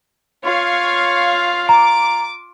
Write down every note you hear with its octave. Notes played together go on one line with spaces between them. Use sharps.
F4 C#5 F5
A#5 D6